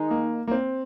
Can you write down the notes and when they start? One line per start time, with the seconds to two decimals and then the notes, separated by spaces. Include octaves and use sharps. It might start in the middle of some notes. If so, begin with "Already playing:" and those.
Already playing: D#3 G#3 D#4
0.11 A#3
0.48 A#3
0.51 C4